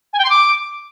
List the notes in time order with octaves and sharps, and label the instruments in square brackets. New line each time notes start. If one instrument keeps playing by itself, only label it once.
[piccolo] G#5
G5
C6
D6